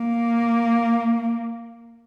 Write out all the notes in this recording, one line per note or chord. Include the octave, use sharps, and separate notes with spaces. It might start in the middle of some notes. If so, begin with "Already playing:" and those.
Already playing: A#3